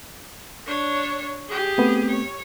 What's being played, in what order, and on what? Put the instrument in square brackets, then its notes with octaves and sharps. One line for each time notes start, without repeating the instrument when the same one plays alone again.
[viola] D4 C#5
G4 G#4
[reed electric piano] A3 B3 C4
[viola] C#5